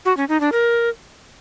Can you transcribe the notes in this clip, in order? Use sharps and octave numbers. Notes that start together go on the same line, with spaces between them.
F#4
C#4
D#4
D4
A#4